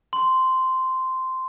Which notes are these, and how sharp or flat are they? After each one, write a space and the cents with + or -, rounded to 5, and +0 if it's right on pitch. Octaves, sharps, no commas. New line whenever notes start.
C6 -10